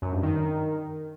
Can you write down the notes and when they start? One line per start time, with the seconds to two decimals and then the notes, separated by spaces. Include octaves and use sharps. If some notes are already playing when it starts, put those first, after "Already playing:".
0.02 F#2
0.12 G2
0.23 D#3